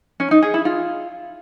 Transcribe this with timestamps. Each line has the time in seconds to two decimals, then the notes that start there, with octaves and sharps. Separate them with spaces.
0.20 C#4
0.31 D#4
0.43 G#4
0.54 E4
0.65 F4